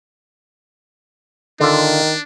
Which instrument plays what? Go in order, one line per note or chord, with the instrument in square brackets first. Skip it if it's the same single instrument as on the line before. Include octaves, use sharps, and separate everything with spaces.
[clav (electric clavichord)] D3 F4 [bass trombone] D#3 [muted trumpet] D4